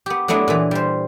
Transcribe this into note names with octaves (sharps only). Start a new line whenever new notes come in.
B3 G4
F#3 A3 B3 D4 E4 D#5
A#2 E3
G3 C5